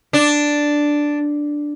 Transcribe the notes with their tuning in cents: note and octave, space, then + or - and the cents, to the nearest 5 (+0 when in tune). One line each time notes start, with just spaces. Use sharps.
D4 +0